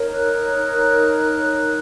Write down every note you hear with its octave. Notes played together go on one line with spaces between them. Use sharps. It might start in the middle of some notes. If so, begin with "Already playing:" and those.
Already playing: D#4 A#4 C#5
F#6